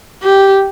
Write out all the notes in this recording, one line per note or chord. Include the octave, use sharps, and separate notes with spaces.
G4